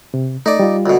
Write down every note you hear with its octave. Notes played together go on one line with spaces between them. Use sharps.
C3
A3 D#4 D5
G3 F4
D2 B2